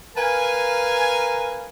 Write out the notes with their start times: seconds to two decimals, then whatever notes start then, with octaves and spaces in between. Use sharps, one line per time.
0.16 A#4 B4 F5 G#5